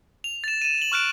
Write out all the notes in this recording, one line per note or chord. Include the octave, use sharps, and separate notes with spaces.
F7
A6 E7
D#7 E7
E7 F#7
C#6 F6 F#6 D7